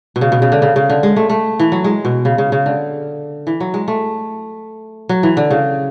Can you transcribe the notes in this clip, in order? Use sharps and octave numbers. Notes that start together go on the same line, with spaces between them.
B2
C#3
B2
C#3
D3
C#3
C#3
D3
G#3
A3
A3
E3
F#3
G#3
B2
C#3
C#3
C#3
D3
E3
F#3
G#3
A3
F#3
E3
D3
C#3